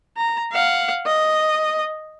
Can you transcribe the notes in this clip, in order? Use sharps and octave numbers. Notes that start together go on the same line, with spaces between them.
A#5
F5 F#5
D#5